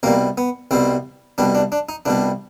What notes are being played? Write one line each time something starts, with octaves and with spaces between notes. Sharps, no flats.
C2 B2 G3 A#3
B3
C2 B2 G3 C4
C2 B2 G3 D4
D4
D4
D#4
C2 B2 G3 D4